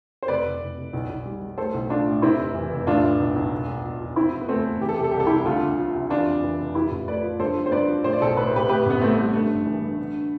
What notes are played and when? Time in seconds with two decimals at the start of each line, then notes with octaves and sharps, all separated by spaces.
0.23 C5
0.28 F1 B4 D5
0.44 F1
0.61 F1
0.77 F1
0.93 B1
1.09 B1
1.26 G3
1.42 G3
1.58 A3 A4 C5
1.74 B1
1.90 A3 D4 F4
2.06 A2
2.22 C3 C4 E4
2.39 F1
2.54 E3
2.71 F1
2.87 A2 D4 F4
3.03 A2
3.20 B1
3.35 B1
3.52 E1
3.68 E1
3.84 F3
4.01 F3
4.16 C3 C4 E4
4.33 F3
4.41 B3
4.48 E2 A3 C4
4.65 E2
4.81 E3 G4
4.89 A4
4.96 C3 G4
5.04 A4
5.11 C2 G4
5.20 A4
5.27 C2 E4 G4
5.46 D2 F4 A4
5.62 D2
5.78 F3
5.94 C3
6.10 E3 D4 F4
6.27 F2
6.43 E3
6.59 F1
6.75 F3 E4 G4
6.91 A1
7.08 A3 B4 D5
7.23 F3
7.39 G2 A4 C5
7.55 F3
7.66 C5
7.72 G2 B4 D5
7.88 F3
8.04 A2 C5
8.13 D5
8.20 B1 A4 C5
8.37 A2 B4
8.47 C5
8.53 A2 G4 B4
8.69 A2 G4 B4
8.86 A1 B3
9.01 A2 A3 C4
9.18 G3
9.33 G2 A3
9.50 G1
9.66 E3
9.82 G2
9.98 D3